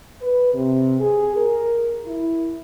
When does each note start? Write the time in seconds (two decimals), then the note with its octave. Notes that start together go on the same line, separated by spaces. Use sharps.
0.21 B4
0.54 C3
0.99 G#4
1.35 A#4
2.05 E4